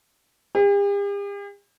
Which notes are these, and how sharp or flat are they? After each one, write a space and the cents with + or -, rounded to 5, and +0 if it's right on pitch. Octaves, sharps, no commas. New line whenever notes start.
G4 +45